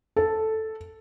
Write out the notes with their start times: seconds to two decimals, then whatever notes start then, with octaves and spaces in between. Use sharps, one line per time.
0.16 A4